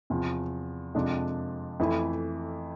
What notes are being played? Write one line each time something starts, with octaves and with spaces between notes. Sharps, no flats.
E2 C3 F3
F2 C3 F3 G#3 D4
F2 E3 A3 E4